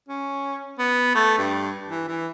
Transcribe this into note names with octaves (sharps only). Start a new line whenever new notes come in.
C#4
B3
A3
G2
E3
E3